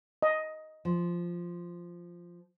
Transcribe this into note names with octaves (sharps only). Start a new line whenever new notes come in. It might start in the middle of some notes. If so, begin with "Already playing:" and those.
D#5
F3